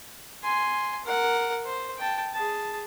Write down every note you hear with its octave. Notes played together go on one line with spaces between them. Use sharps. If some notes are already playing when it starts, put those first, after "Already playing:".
G#5 C6
A#4 F#5
C5
G5 A5
G#4 A5